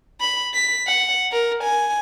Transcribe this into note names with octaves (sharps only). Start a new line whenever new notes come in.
B5
B6
F#5
A#4
G#5